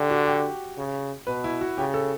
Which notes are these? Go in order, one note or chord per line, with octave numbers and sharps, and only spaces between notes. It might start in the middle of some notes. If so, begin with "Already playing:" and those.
Already playing: D3 G4
F#4
G4
C#3
B2 B4
E4
F#4
C#3 G4
A4